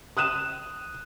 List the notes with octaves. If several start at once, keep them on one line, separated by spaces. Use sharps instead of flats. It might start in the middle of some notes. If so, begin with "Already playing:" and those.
D#6 F#6 D#7 E7